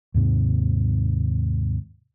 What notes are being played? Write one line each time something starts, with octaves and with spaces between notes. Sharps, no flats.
D#2 G#2 C3